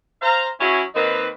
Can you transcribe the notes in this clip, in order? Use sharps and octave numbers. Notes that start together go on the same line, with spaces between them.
C5 F5 A#5
F#3 C#4 E4
D#3 A#3 C4 D#4 B4